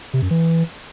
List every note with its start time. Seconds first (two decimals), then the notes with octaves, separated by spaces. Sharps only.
0.13 C3
0.22 F#2
0.31 E3